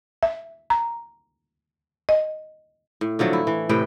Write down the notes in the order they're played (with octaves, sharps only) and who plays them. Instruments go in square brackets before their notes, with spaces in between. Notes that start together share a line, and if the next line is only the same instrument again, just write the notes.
[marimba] E5
A#5
D#5
[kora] A2
D3 F3 F#3 A3
E4
E3
A2 C3 B4 G5